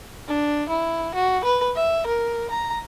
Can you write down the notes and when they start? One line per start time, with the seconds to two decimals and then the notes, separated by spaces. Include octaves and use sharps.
0.28 D4
0.69 E4
1.15 F#4
1.44 B4
1.76 E5
2.07 A#4
2.51 A#5